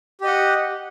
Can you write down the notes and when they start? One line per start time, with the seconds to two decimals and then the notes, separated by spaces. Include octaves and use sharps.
0.21 G4
0.24 D#5
0.27 F#5